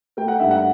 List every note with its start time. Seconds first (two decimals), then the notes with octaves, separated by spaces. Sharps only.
0.17 A3 G5
0.28 F#5
0.39 G2 E5
0.51 F#5